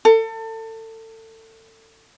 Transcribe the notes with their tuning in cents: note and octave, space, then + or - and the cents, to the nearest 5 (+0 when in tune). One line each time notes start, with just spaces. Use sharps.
A4 +30